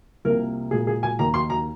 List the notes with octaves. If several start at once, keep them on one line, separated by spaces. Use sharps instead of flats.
C2 C3 F3 A#3 A#4
A#2 G#3 G#4
G#4
G#5
D#2 D#3 A#3 A#5
C6
A#5